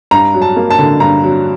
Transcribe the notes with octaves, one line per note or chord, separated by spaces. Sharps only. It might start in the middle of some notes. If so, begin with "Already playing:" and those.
G2 A#5
F#3
A5
A#3
A5
D3
G2 A#5
F#3